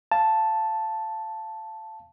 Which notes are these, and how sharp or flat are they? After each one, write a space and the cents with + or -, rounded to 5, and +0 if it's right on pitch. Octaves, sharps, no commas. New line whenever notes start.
F5 -15 A5 +0